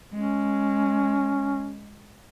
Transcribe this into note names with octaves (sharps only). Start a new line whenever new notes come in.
G#3 C#4